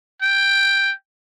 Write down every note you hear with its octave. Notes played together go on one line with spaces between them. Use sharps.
G5